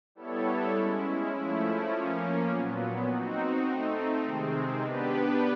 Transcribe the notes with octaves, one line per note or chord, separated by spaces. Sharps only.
G3 B3 E4 A4 C#5
G#3 C#4 E4
F3 A3 C#4 E4
F3 A#3 C#4
A#2 F#3 B3
C4 D#4 F#4
A3 C4 D#4
C3 D#3 G#3 C4
B3 D4 G4 B4